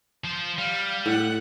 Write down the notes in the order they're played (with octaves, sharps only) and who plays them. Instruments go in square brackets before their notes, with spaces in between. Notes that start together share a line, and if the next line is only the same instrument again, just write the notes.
[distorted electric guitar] F3 C5
[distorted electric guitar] G3 [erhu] F5
[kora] A2 [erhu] F#5